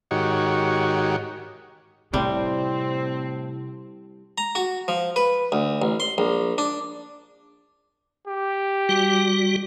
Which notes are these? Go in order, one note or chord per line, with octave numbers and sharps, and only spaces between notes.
G#2 D#3 F#4 G4 C#5
A2 C3 G3 C4
A#5
F#4
F3
B4
D2
A1
C6
A#1
D4
G4
G3 F#4